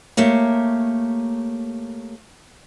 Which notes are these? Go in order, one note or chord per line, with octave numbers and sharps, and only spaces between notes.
A3 A#3 G4 C#5